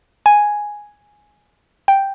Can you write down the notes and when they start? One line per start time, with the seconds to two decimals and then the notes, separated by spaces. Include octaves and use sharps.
0.26 G#5
1.88 G5